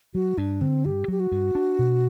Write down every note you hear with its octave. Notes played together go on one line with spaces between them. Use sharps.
F#3 F#4
G2 D4
D3 C4
G2 G4
F#3 G4
F#4
G2
D4
B2